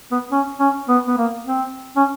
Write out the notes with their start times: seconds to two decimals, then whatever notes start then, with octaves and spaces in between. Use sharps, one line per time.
0.12 B3
0.32 C#4
0.60 C#4
0.88 B3
1.07 B3
1.17 A#3
1.46 C4
1.96 C#4